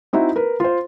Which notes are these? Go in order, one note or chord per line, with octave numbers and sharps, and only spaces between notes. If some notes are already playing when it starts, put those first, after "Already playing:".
C4 D#4 E4 F#4
A#4 B4
F4 C5